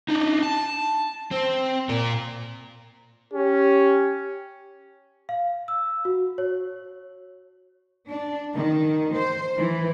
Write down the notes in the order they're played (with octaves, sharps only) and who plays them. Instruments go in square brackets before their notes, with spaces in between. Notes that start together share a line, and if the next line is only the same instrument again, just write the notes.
[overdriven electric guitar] D4 D#4
A5
C4
A#2 A#4
[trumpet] C#4 [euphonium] G4
[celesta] F5
E6
F#4
C#5
[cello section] D4
D#3
C5
E3